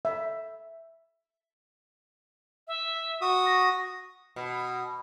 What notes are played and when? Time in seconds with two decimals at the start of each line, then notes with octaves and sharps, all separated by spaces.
0.05 E5
2.67 E5
3.21 F#4 D#6
3.46 A#6
4.36 B2